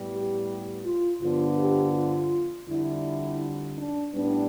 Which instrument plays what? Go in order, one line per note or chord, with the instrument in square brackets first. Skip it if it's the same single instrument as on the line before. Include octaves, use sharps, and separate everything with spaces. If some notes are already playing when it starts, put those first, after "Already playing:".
Already playing: [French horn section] A2 G3 B3
G4
F4
G2 D3 F3 B3 F4
G4
F4
F2 D3 G3 E4
D4
A2 G3 B3 D4